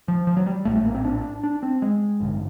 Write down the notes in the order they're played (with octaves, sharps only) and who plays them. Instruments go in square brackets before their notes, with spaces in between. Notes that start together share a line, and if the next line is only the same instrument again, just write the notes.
[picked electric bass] F3
F3
F#3
G3
A#1 A2 A3
A3
A#3
C4
D4
D4
C4
G#3
A1 G2 D3